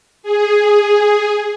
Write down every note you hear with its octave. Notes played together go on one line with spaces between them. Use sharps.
G#4